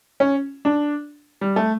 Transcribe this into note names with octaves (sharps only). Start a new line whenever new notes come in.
C#4
D4
G3
A3